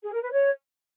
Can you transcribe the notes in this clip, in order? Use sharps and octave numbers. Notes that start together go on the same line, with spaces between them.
G#4
A#4
B4
C#5